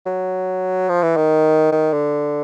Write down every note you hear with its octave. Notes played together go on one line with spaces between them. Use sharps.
F#3
F3
E3
D#3
D#3
D3